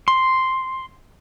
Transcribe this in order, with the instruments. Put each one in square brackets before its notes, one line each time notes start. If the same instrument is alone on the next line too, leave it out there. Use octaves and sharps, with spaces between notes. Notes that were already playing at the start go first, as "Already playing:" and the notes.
[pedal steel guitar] C6